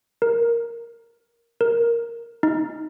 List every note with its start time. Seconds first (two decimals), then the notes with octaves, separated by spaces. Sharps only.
0.22 A#4
1.61 A#4
2.43 D#4